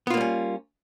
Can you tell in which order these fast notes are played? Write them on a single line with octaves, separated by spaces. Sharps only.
B3 F4 A#3 G3 C#4